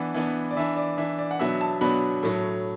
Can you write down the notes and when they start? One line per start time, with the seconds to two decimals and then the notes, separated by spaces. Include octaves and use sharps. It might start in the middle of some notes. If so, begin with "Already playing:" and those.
Already playing: E3 B3 D4 F#5
0.14 E3 B3 D4
0.51 D5
0.57 E3 D4 E5
0.77 D5
0.97 E3 D4 E5
1.19 D5
1.31 F#5
1.39 B2 F#3 B3 D4 E5
1.61 A5
1.81 B2 F#3 B3 D4 B5
2.23 A2 F#3 A3